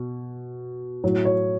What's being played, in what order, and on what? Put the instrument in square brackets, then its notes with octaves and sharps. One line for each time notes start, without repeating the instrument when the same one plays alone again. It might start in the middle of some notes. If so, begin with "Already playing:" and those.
Already playing: [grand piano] B2
A2 F#3
C#5